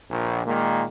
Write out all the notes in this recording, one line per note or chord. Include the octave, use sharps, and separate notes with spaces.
A#1
A#2 D#3 G#3 A#3